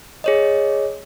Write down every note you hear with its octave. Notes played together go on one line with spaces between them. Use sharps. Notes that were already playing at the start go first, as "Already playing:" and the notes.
G#4 C#5 D#5